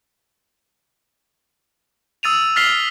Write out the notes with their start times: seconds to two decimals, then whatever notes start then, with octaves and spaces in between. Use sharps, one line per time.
2.23 D#6 E6 A6 D#7 F7
2.56 F6 A6 B6 C7 F7 G7